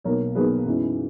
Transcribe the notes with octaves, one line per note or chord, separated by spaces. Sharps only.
B1 B2 A#3 A#4 C#5
B1 B2 A#3 G#4 B4
F#2 E3 G#3 B3